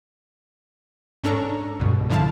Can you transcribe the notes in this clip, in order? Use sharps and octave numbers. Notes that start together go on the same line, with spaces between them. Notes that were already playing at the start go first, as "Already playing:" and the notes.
G#2 C#4 D4 A4 A#5 C#6
C#2 G2 B2
G#2 D3 F3 E4 F5 A5